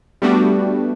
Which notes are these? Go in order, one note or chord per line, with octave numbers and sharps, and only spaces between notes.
G3 A3 B3 D4 F#4 G4